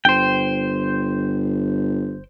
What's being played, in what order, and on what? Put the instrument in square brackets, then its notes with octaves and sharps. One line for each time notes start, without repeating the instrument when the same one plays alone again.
[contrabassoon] G1 [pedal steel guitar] C5 G5